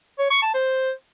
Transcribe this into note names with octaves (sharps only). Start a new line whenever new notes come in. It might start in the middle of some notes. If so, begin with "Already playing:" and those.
C#5
C#6
A5
C5